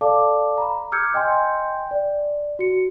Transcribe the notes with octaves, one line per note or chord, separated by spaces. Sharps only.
A4 D5 F5 A5 D6
A#5 B5
D6 E6 F6 G6 G#6 C#7
D#5 G5 G#5 C6 G6
D5
F#4 C#7